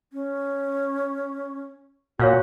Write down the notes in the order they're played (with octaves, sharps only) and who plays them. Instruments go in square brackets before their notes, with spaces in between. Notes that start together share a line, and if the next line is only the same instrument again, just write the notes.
[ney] C#4
[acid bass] A#2 [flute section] F#4 [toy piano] C#5 F5 F#5